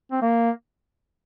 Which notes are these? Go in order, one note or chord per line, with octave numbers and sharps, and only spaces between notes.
C4
A#3